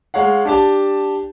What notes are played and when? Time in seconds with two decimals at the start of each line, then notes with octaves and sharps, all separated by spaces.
0.14 G#3 C#5 F5 F#5
0.45 D4 G4 A5